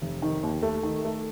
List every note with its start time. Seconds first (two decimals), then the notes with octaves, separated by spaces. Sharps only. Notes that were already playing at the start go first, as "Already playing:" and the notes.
0.02 F1
0.22 D#3
0.43 D#2
0.63 A3
0.83 D#3
1.05 A3